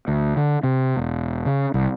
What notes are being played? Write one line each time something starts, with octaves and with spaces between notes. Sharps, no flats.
D2
D3
C3
E1
C#3
C2